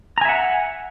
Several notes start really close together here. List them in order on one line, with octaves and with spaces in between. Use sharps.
A#5 G#5 E5 F#5